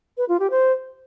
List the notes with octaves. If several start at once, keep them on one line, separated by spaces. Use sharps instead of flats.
B4
F4
G4
C5